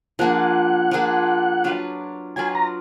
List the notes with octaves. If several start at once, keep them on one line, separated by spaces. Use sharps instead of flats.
F3 A#3 D4 G#4 F#5
F3 A#3 D4 G#4
F#3 D4 F4 B4
F#3 D4 F4 B4 G#5
A#5